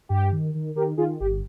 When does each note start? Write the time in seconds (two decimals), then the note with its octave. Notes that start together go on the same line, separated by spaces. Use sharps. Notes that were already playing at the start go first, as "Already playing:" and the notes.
0.09 G2 G4
0.32 D#3
0.54 D#3
0.75 D#3 G4 A#4
0.97 D#3 F4 G#4
1.20 G1 G4